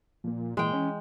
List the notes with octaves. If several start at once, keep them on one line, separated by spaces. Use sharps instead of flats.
A#2 F3 A#3
A#2 E3 G#3 G5
C#4